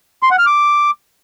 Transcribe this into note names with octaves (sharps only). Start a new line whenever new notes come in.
C6
F#5
F6
D6